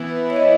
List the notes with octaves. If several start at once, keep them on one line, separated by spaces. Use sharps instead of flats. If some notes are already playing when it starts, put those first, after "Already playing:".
Already playing: E3 B3 E4
C#5
D#5